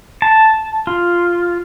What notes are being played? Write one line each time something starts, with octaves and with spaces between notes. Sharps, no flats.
A5
F4